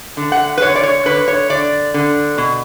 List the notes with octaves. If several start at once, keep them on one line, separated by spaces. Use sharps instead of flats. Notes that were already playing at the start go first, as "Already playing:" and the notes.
D3
F#5
B4
D3 C#5
D5
C#5
D3 B4
C#5
D3 D5
D3
B2